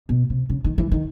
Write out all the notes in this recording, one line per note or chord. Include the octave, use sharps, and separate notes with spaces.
B2
C3
C#3
D#3
E3
D#3